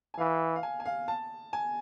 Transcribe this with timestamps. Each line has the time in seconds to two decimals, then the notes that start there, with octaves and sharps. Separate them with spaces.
0.14 G#5
0.18 E3 F5
0.56 F5
0.63 G#5
0.80 G#5
0.86 F5
1.08 A5
1.53 G#5